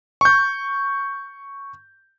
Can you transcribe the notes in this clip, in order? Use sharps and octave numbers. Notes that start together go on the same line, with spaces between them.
C#6 G6